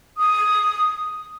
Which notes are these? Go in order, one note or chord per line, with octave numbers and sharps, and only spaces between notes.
D#6